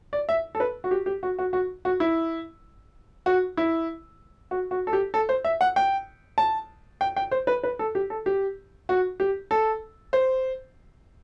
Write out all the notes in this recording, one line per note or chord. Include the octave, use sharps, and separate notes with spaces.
D5
E5
A4
B4
F#4
G4
G4
F#4
F#4
F#4
F#4
E4
F#4
E4
F#4
F#4
A4
G4
A4
C5
E5
F#5
G5
A5
G5
G5
C5
B4
B4
A4
G4
A4
G4
F#4
G4
A4
C5